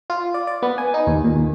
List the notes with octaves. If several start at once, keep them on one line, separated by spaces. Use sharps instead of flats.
F4
D5
D5
B3
G#5
D#4
D#2
A#2
D#2